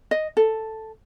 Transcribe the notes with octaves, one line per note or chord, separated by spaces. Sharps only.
D#5
A4